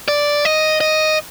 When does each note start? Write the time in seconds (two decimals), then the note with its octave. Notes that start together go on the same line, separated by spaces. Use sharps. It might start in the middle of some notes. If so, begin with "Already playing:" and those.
0.08 D5
0.45 D#5
0.81 D#5